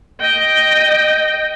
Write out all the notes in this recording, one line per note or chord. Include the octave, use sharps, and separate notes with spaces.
D#5 G5